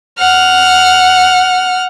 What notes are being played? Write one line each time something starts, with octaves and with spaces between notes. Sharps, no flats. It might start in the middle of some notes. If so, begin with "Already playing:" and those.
F#5 F6